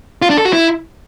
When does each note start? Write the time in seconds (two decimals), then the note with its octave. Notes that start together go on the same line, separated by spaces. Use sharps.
0.22 F4
0.30 D4
0.37 A4
0.45 F#4
0.53 E4